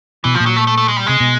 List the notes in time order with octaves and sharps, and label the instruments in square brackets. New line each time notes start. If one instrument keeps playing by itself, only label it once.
[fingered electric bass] B2 [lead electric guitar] E3
[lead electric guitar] F3
[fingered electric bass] A#2
[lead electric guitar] F#3
A3
A3
A3
G#3
G3
[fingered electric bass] C3 [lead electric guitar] G#3
[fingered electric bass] B2